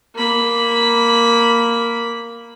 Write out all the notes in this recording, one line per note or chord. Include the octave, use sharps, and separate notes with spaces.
A#3 B5